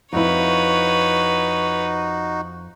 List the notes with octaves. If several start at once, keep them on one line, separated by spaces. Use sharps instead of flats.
F2 D#4 E4 F#4 B4 C#5